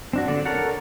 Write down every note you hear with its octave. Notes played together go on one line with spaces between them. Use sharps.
C4 D4 F#4
D3 D5
A4 A#4 C#5 D5 F#5